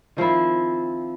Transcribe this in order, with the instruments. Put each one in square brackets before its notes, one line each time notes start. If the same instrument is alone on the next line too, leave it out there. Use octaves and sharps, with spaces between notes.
[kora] D#3 F3 C4 E4